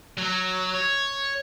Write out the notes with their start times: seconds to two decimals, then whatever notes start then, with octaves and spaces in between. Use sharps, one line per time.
0.18 F#3
0.75 C#5